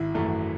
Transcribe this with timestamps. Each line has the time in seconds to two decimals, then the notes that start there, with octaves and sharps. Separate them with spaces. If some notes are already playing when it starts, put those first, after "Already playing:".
Already playing: G#1 E4
0.14 F#2 E3 A3